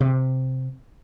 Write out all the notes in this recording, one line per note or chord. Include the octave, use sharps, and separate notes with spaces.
C3